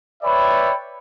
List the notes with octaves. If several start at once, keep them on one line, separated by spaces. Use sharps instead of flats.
B4 C#5 D5 E5 G5 B5